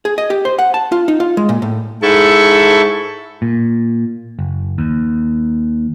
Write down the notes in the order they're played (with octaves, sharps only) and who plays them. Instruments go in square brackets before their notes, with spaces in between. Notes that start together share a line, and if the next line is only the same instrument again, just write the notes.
[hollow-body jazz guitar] G#4
D#5
G4
C5
F#5
A5
F4
D#4
F4
G#3
A#2
A2
[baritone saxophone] G#2 [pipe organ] E4 A4 C#6
[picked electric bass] A#2
F#1
D#2